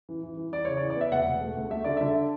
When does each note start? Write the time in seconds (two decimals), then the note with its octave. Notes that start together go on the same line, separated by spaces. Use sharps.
0.09 E3
0.23 E3
0.37 E3
0.52 E3 D5
0.65 C#3 C#5
0.77 D5
0.81 E3
0.90 D5
0.96 B3 E5
1.12 E1 F#5
1.26 E1
1.41 A3
1.57 D2
1.70 A3 E5
1.84 D3 D5
1.97 D3 E5